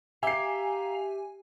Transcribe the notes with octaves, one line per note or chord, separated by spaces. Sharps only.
G4 E5 F5 G#5 A#5 C7